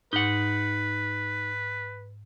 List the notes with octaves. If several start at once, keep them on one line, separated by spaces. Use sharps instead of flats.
G#2 D#4 B4 F#5